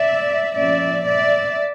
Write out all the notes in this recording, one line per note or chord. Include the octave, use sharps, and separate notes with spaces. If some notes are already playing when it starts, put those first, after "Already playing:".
Already playing: D5 E5
A#2 F3 A#3 C#4 D5 E5
D5 E5